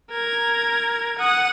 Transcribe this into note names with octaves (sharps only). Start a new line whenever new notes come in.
A#4 G#6
F#5 D#6